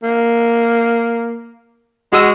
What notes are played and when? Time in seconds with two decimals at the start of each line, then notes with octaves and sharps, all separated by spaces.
0.04 A#3
2.13 G#3 F#4 D#6 E6